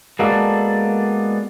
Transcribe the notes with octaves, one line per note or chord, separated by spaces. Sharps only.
G#3 A#3 B3 D4 F#4 A4